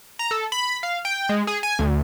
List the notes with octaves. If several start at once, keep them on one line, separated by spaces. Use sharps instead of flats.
A#5
A4
B5
F5
G5
G#3
G#4
G#5
D2